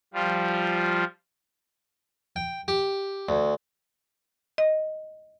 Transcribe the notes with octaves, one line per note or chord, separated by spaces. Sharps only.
F3 G3 F4
G5
G4
D2
D#5